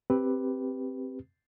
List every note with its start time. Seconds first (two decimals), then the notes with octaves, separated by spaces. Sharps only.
0.10 C4 G4 B4